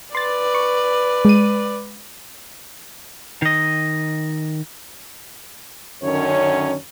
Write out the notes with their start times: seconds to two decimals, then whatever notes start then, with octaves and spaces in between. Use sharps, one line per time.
0.15 B4 D5 C6 A6
0.55 C#6
1.25 G#3 D#7
3.42 D#3 D#5
6.03 F#2 D3 D#3 C#4 C#5